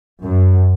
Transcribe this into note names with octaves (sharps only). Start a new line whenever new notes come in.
F#2